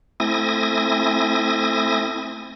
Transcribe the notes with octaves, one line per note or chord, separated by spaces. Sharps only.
A3 C4 E4 G#5 D#6 A#6